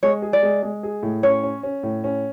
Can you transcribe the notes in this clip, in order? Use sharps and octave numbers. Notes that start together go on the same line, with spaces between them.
G#3 C#5
G#4
D5
G#3
G#3
G#4
A2
C#4 C#5
C#4
C#4
A2
C#4